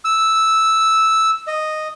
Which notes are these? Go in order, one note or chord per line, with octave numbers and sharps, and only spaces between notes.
E6
D#5